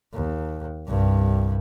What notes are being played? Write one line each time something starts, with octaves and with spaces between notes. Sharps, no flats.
D#2
C2 G2